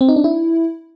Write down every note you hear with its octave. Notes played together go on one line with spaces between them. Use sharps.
C4
D#4
D4
E4